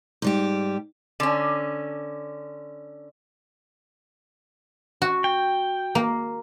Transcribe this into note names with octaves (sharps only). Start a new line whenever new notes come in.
G#2 G3 G4
D3 C#4
F#4
G5
A#3